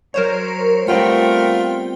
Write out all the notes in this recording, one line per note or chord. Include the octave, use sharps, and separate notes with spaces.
F#3 A#4 C5 C#5
G3 A3 B3 C4 F4 A#4 G5